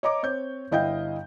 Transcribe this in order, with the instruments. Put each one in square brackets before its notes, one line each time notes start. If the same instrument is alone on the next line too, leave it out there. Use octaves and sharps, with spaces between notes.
[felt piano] C#5 D#5 A#5 D6
C4 C#5 G6
G1 E4 D#5 F5 G5 G6